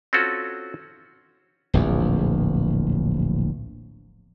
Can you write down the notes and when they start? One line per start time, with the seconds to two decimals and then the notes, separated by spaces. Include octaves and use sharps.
0.13 C4 C#4 F4 F#4 A4
1.74 D1 A#1 E2